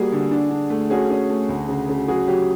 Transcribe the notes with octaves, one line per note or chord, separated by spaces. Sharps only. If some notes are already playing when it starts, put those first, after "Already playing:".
Already playing: G3 A#3 F#4 G#4
D3
D4
D4
A3
C#4 F#4 G#4
C#4
A3
D2
C#3
C#3
F#3 F#4 G#4
F#3 G4